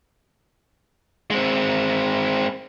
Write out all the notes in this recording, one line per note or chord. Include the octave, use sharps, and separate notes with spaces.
G#3 C4